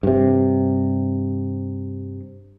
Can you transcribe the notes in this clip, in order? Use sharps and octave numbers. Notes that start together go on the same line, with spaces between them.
G2 C3